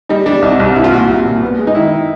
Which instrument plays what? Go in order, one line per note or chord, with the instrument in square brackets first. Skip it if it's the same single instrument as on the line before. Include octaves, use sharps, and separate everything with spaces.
[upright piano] G3 [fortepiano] D#4
[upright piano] G3 [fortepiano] D4
[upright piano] C2 [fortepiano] D#4
[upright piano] C2
[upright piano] C2 [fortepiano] E4
[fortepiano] F4
[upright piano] A#2 [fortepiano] F#4
[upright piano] C2
A#2
B3
G#3
[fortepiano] D#4
[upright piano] D#3 [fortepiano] E4